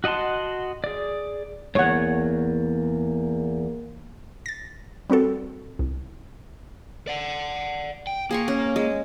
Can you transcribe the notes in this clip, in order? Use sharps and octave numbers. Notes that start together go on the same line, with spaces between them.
F#4 D#5 F#5 A5 C6
G#4 D5
E2 G#2 A#3 C#5 F#5
A6 A#6
G3 C4 F#4 A4
C2
D5 F#5
G5
A#3 G#4 C6 C#6
C#4
G#3